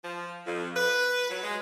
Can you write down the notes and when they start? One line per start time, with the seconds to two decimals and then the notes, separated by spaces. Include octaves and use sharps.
0.03 F3
0.46 F2
0.75 B4
1.29 F#3
1.42 G#3